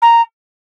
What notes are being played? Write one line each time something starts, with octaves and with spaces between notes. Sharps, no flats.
A#5